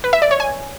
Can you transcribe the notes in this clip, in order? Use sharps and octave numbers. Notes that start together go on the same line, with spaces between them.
B4
E5
D5
C#5
G#5